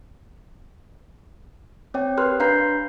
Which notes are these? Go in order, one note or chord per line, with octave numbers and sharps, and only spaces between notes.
C4 C#5 G5
G4 A#4 B4 C6 F6 F#6
D4 B4 F5 A#5 G6 C7